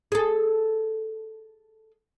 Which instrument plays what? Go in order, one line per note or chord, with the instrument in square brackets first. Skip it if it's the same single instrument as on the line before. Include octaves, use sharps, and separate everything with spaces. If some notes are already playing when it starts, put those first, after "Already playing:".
[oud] G#4 A4